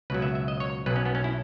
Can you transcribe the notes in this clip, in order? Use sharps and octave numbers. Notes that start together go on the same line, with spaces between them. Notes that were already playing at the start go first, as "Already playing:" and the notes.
C#2 B2 F#3 B4
E5
E5
D#5
C#5
B1 B2 F#3 B4
C#4
B3
C#4
E4